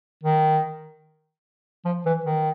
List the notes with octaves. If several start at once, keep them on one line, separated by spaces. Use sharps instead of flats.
D#3
F3
E3
D#3